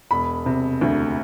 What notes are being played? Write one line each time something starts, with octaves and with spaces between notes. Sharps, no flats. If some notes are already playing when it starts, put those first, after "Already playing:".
E1 B5
C3
D2